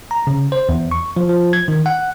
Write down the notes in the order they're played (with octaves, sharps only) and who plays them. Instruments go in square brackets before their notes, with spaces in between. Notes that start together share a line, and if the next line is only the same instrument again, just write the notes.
[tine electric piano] A#5
C#3
C5
E2
C#6
F3
F3
G#6
D#3
F#5